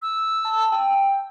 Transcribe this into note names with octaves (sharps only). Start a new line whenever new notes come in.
E6
A5
G5